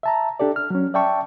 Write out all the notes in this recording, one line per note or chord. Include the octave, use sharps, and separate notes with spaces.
E5 A5 A#5
D4 G4 A4 D5
F6
F#3 C#4
D5 E5 G5 A5 C#6